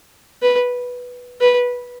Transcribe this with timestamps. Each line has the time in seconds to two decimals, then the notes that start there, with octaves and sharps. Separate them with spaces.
0.42 B4
1.41 B4